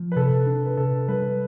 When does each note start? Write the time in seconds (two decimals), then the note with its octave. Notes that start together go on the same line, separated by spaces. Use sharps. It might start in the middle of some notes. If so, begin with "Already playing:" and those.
Already playing: F3
0.12 B4
0.16 C3 A4
0.47 D4
0.66 B4
0.77 C3 A4
1.08 G3 B4